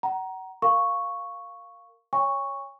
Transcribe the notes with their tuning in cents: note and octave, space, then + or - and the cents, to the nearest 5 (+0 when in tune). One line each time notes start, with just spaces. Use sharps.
F#5 +35 A#5 +15
A#4 -20 F5 +0 C#6 +0
C#5 +5 G#5 -40 C#6 +0